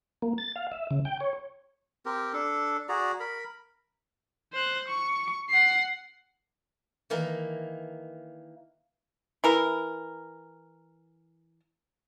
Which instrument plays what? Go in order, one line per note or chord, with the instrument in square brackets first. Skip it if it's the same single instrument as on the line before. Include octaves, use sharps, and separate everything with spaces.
[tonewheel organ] A#3
A6
F5
E5
C#3
G5
C#5
[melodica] C4 G4 A#4
D4 A4
F#4 G#4 D5 A#5
A#4 B5
[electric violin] C5 F#6
C#6
F#5 C7
[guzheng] D#3 E3 A#3
[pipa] E3 A#4